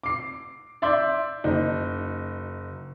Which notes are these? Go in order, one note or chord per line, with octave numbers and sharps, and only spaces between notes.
D6 C7
D5 E5 C6 D6 G6
F#1 D#4